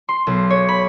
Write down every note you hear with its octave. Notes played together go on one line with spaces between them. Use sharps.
C6
B1
C#5
B5